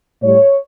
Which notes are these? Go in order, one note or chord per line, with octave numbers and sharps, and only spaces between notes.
A2 G3 C#5